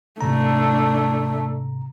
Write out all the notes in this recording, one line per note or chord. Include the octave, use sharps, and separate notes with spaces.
G#2 C3 A3 D4 A#5